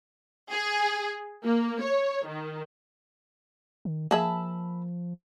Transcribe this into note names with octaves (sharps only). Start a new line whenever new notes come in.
G#4
A#3
C#5
D#3
D#3
F3 A#3 G#4 E5 A5 B5 E6